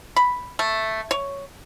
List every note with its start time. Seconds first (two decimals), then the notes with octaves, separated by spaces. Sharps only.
0.16 B5
0.59 A3
1.11 C#5